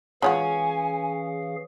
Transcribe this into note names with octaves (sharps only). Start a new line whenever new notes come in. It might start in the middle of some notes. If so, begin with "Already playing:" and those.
E3 G#3 C#4 F4 F#4 G#4 F5 G#5